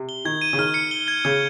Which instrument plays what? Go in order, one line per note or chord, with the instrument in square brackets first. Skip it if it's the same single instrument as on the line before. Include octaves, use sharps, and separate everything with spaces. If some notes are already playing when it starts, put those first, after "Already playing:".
Already playing: [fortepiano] C3
[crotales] G7
[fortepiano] D#3 [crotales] G#6
[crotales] D#7
[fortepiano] C#3
[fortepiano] D#3 [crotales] F6
[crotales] C#7
G7
G#6
[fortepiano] C#3 [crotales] G#6